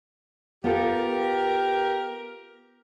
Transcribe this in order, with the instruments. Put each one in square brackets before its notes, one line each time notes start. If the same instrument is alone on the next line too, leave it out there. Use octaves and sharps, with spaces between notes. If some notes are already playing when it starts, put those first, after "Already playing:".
[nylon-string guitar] B3 F4 A4 [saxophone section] G4 A#4